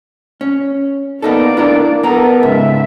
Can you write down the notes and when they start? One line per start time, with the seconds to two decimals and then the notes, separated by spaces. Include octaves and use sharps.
0.41 C#4
1.22 A#3 B3 D#4 A4 D5
1.57 D4 E4 A#4
2.03 B3 A4 A#4 A#5
2.43 G#2 C#3 E5